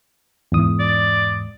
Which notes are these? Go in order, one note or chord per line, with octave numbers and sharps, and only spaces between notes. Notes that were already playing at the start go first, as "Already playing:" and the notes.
E2 G#2 D#6
D5